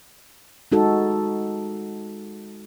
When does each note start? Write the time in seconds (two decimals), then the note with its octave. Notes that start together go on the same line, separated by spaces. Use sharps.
0.72 G#3 D#4 F#4 A4